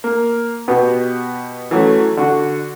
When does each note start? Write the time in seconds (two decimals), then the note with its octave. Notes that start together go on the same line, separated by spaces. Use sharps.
0.04 A#3
0.68 B2 B3 F#4 G4 B4
1.71 E3 F#3 A3 C#4
2.17 D3 F#4